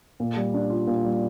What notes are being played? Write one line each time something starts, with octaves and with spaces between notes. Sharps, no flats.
A#2
G3
D4
F4
A#2
G3